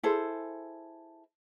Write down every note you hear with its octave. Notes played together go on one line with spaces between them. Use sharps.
E4 G#4 A4 C5